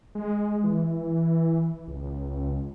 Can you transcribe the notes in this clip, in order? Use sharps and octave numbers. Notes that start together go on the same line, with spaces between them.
G#3
E3
C#2